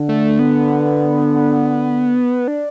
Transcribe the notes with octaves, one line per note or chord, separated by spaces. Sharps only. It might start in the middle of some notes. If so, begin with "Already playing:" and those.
Already playing: D3
A3
B3
D4